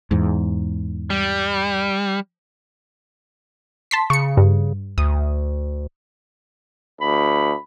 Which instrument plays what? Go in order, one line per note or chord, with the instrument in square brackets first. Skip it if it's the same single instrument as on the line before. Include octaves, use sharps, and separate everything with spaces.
[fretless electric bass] E2 G#2
[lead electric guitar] G3
[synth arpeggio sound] A5 C6 B6
[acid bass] C#3 [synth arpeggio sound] C#6 C#7
[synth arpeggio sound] G2
[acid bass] D2 [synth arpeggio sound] D#6
[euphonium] D2 [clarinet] B5